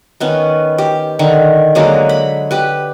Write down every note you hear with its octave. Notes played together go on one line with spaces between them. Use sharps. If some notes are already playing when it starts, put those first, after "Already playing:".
D#3 B3 C#4
G4
D3 D#3
D3 F#3 G#3 A#3
B5
G4 B4